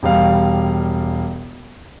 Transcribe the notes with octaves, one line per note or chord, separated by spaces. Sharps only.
E1 G3 F5